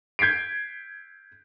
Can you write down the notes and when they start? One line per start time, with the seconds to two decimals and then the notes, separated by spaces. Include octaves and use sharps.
0.19 G6 G#6 B6 C7 D7